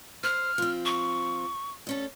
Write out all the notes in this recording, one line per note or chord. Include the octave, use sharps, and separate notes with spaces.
C5 F6
F3 C4
C#6
D2 C#4 A4